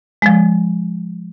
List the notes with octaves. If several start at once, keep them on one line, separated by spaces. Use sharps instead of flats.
F3 G#3